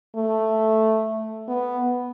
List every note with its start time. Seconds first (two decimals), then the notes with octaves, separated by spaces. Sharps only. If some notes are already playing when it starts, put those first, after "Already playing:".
0.16 A3
1.48 B3